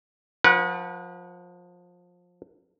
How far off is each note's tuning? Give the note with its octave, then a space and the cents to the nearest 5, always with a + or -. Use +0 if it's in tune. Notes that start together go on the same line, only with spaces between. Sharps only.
F3 +25 B4 -40 F#5 +0